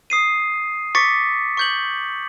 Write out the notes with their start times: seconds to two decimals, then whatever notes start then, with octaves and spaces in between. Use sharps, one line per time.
0.10 D#6 C7 D#7
0.95 C#6 D6 A6 B6 C#7
1.57 C#6 G6 F#7